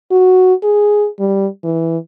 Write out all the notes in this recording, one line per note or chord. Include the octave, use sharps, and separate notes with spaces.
F#4
G#4
G3
E3